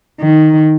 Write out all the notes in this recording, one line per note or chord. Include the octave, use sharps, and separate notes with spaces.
D#3